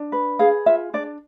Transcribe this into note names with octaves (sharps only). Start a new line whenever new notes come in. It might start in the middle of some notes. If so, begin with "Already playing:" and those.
Already playing: D4
B4
G#4 F5
F4 E5
D4 D5